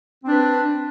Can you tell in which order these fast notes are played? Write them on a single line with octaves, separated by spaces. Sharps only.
C4 D4 B4